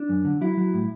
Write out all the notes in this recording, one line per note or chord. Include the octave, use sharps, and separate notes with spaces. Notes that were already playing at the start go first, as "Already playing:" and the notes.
Already playing: D4
F#2
D3
F#3 E4
F#3
A2